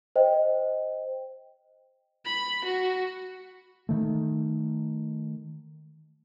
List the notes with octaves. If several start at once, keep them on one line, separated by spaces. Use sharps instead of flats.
C5 D#5 G5
B5
F#4
D#3 A3